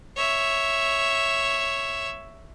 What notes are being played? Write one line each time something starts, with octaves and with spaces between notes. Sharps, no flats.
C#5 E5